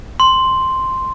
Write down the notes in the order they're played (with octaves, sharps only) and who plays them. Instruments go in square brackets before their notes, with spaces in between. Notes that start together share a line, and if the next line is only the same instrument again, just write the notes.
[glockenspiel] C6